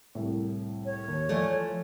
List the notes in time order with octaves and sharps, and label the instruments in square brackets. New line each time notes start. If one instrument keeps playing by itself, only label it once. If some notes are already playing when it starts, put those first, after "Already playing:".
[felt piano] C2 A2
[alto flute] C#5
[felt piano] D#2
[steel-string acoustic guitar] E3 F3 A3 [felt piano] D5 E5